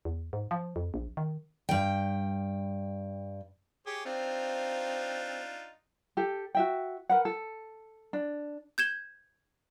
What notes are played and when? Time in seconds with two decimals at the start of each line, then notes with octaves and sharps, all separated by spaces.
0.05 E2
0.33 G#2
0.51 F3
0.76 F2
0.94 A#1
1.17 D#3
1.69 G2 G5
3.87 G4 G#4 C#5
4.05 C4 D4 D#4 F4
6.17 G4 A4
6.55 F#4 E5 G5
7.09 A#4 B4 F#5
7.25 A4
8.13 D4
8.78 G6 G#6 E7 G7